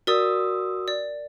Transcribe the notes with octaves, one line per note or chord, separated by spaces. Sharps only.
F#4 A#4 D5 D#6 E6
D5